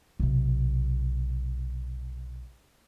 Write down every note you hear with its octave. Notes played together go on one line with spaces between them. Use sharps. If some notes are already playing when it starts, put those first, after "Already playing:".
B1 C3